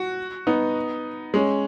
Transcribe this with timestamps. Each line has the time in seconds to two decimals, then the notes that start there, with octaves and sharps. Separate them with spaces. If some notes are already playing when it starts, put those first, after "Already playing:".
Already playing: F#4
0.47 B3 D#4
1.34 G#3 C#4